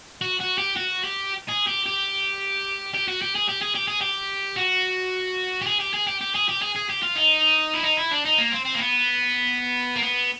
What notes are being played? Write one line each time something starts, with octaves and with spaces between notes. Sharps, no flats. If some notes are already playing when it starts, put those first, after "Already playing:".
F#4
F#4
G4
F#4
G4
G#4
G4
G4
G4
F#4
G4
G#4
G4
G#4
G4
G#4
G4
F#4
G4
G#4
G4
G#4
G4
G4
G#4
G4
G#4
G#4
G4
F4
D#4
E4
D#4
E4
D4
D#4
A#3
C4
C4
A#3
B3
A#3
B3